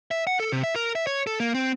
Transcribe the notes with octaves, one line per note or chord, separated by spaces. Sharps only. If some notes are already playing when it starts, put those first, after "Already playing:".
E5
F#5
A4
C3
E5
A#4
E5
C#5
A4
A#3
C4